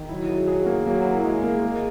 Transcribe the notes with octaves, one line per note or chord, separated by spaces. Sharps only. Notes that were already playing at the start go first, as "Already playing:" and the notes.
Already playing: D#3
F#3 E4
G#4
G#4
A#3
F#3 A#3
E4
G#3 G#4
A#3
G#3